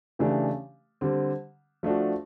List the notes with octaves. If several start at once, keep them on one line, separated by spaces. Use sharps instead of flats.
C#3 E3 A3 D4 G4
D3 G3 C4
F3 A3 D4 F#4